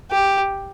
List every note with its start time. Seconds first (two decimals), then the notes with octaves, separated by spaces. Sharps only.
0.11 G4